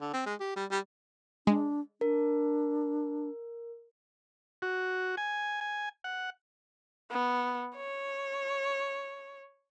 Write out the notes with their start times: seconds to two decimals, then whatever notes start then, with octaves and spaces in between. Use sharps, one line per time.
0.01 D3
0.13 C4
0.26 G#3
0.40 G4
0.56 G3
0.71 G3
1.47 G#3 D4
2.01 D4 A#4
4.62 F#4
5.17 G#5
5.61 G#5
6.04 F#5
7.11 B3
7.76 C#5